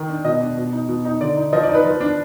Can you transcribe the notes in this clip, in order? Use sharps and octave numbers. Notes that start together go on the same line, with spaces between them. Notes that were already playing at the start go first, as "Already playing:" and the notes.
Already playing: D#3
D4
B2 D#5
D4
B2
D#4
B2
D#4
D3 D5
D#4
F3 D#5
D5
D#4
B4
F3
D4